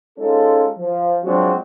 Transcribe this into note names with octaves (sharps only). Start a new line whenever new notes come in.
G#3 C#4 D#4 F4 A4
F3
F3 F#3 G#3 C4 D4 F#4